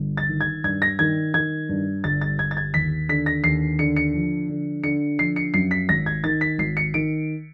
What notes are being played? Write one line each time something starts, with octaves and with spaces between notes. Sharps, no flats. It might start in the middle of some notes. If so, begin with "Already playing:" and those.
Already playing: G1
A6
D#3
G#6
G2 G#6
A#6
D#3 G#6
D#3 G#6
G2
G1 A6
A6
G1 G#6
A6
G#6
D#2 B6
D3 B6
A#6
D#2 C7
D3 C#7
C#7
F3
D3
D3 C#7
F3 C7
C#7
F#2 C7
B6
G#1 A#6
G#6
D#3 A6
B6
G#1 C7
C#7
D#3 D7